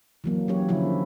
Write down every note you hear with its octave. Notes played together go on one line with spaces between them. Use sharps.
E3 F#3 A#3
F#3 C#4 G4 C#5
D3 F3 C#4 E4